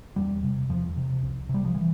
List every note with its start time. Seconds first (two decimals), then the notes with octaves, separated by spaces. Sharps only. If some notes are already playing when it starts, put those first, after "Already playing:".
0.16 E2 G3
0.43 C3
0.69 E2 F3
0.96 C3
1.23 C2
1.49 C3
1.54 G3
1.65 F3
1.75 E3